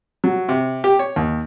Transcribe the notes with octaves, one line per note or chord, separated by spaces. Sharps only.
F#3
C3
G4
C#5
D#2